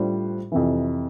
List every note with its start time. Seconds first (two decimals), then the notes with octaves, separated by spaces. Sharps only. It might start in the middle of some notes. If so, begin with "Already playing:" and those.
Already playing: A2 G3 D4 F4 C5
0.52 F2 C3 E3